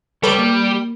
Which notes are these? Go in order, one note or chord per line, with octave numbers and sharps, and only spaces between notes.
D2 G3 A4 B4 C#5 D6
A#3